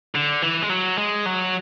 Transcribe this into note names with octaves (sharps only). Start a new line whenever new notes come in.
D3
E3
G#3
F#3
G#3
F#3